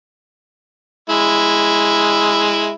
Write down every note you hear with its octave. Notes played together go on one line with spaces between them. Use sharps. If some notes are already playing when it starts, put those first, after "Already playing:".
G#3 E4